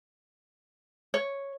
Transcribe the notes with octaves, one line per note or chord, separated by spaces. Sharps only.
C#5